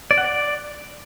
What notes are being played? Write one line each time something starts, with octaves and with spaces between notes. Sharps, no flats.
D5
F#5
D5